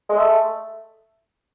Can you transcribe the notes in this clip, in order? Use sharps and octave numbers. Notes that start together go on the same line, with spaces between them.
G#3
A3